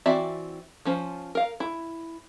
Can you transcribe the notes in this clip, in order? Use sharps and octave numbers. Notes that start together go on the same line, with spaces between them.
E3 C4 F#4 D5 E5
F3 C#4 C5
A#4 F5
E4